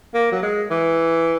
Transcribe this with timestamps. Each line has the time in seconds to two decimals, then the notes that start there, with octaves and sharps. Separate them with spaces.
0.14 A#3
0.32 F#3
0.42 G#3
0.70 E3